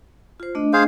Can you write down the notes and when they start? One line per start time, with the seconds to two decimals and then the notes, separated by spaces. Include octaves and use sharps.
0.40 F4 C5
0.55 A3 D4 D#5
0.73 G#4 C5 F5